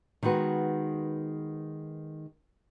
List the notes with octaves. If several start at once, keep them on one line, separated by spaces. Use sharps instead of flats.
D#3 G#3 B3 F#4 B4